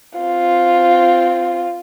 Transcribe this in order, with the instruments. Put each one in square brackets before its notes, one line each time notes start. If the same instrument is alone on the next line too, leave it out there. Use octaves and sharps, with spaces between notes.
[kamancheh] C4 F4